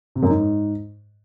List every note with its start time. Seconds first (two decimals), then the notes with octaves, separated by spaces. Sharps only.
0.15 C3
0.23 F#2
0.30 G#2